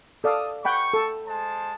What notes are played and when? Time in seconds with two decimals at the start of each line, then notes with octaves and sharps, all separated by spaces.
0.24 A4 D5 F5 D#6
0.65 F#5 G5 B5 C#6
0.94 A4
1.26 G#3 C5 A5